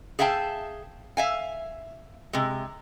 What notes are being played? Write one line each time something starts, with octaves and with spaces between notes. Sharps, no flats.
G#4 E5 F5 G5 A5
E5 F5 G#5
C3 G#3